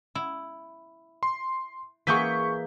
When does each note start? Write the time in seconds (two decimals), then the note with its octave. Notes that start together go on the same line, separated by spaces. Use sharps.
0.15 E4
1.23 C6
2.07 E3 A#3 G#4 C#6 G6 B6